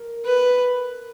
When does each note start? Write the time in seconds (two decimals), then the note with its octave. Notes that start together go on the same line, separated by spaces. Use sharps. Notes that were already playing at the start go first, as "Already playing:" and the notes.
Already playing: A#4
0.25 B4